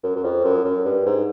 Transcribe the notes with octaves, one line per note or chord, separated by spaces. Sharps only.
F#2
F#2
F2
F#2
F#2
G2
G#2